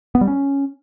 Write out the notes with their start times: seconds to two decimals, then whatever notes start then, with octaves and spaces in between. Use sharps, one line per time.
0.15 B3
0.21 G3
0.28 C#4